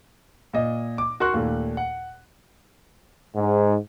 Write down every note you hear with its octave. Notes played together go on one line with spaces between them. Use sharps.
A#2 D#5
D6
F#4 A#4 C6 C#6 F#6
D#2 A#2 A3
F#5
G#2